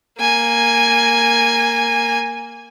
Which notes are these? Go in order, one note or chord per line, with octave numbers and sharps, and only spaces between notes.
A#3 G#5